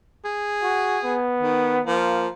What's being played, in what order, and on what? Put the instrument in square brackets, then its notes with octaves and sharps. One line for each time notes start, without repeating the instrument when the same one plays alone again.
[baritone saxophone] G#4
[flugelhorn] F#4
B3
[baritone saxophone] D#3
[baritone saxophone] F3 [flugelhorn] A#3